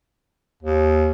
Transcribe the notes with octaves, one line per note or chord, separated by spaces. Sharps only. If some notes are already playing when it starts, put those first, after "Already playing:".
D#2